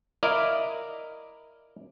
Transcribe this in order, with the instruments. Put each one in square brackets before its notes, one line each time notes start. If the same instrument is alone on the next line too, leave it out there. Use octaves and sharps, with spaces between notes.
[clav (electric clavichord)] E4 A#4 D5 D#5 F5